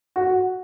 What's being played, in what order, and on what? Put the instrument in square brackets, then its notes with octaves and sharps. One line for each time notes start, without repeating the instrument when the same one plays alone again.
[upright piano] F#4